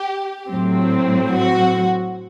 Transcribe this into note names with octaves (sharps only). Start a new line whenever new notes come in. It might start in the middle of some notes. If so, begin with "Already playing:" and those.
Already playing: G4
A2 F#3 C4
F#4